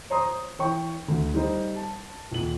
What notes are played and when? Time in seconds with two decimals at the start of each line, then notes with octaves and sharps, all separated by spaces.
0.10 C5 C#5 A#5 C6 D#6
0.59 E3 C#5 G5 C#6
1.08 D2
1.34 G3 D#4 C5
1.76 A5
2.31 D#1 F#7